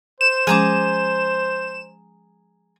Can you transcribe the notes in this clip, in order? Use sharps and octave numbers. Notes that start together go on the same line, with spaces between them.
C5 E7
F3 G#3 C#4 G#4 A#5 D6